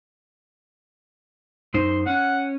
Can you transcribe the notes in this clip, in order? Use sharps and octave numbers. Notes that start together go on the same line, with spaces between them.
F#2 D#4 C5 C6
C#4 F#5